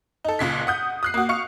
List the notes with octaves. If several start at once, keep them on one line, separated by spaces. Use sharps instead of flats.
D#4 A4
F#1 C#2 A#2 B6
F#5 D#6 G6
D#6 F#6 C7
A#3 F#4
F5 C#6 C#7